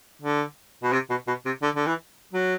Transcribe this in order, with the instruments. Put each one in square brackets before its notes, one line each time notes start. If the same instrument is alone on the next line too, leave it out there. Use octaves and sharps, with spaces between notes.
[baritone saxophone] D3
B2
C3
B2
B2
C3
D3
D3
E3
F#3